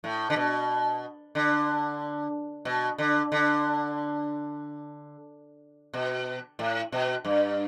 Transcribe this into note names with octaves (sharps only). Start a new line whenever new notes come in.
A2
D3
B2
D3
B2
D3
D3
B2
A2
B2
G2